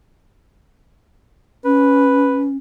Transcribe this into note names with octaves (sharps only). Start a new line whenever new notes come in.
C#4 B4